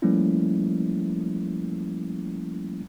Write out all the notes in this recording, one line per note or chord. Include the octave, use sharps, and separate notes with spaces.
F3 G3 A3 A#3 C#4 E4